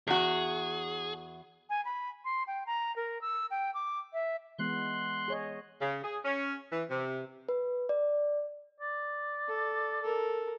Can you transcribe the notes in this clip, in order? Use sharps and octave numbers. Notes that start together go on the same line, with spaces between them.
E2 F#4 G#4
G#5
B5
C6
G5
A#5
A#4
E6
G5
D6
E5
E3 G#3 B3 C6 F#6
G#4 C#5 D#5
C#3
G#4
C#4
E3
C3
B4
D5
D5
A4
A4 A#4